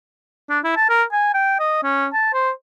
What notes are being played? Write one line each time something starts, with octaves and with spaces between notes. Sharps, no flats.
D4
E4
A5
A#4
G#5
G5
D#5
C#4
A5
C5